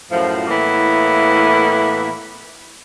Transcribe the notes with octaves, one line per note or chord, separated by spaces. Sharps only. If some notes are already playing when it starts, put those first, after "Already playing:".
F#2 A2 F3
A2 E3 A#3 B3 E4